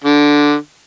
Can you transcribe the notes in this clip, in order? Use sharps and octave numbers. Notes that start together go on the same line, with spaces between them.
D3